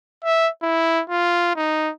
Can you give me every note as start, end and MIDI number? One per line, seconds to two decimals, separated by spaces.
0.25 0.49 76
0.63 1.02 64
1.10 1.55 65
1.56 1.91 63